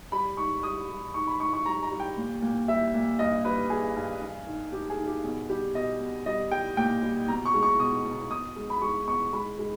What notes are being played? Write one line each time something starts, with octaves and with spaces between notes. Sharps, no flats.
G3 B5
G#2 C#6
G3 D#6
G3
G#2 C#6
B5
G#2 C#6
C#6
G3 A#5
A#5
G3
G5
A#2
A#2
G3 E5
A#2
G2 D#5
G3 B4
G3 G#4
G2
G2
D#3
D#3 G4
G#4
D#3
G4
B2 G#4
G3 G4
B2 D#5
B2
G3 D#5
G3 G5
A#2 G5
G3
B2 A#5
C#6
G#3
C#6
B2 D#6
B2
B2 D#6
G#3
B5
G#3 C#6
B2 C#6
G#3 B5
G#3